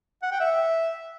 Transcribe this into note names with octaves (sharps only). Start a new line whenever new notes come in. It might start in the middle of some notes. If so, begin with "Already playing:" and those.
F#5
G5
E5